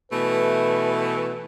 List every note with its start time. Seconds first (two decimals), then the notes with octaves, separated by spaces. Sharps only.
0.12 B2 E3 A3 B4